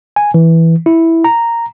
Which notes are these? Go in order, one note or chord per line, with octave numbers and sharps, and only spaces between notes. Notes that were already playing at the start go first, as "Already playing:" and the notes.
G#5
E3
E4
A#5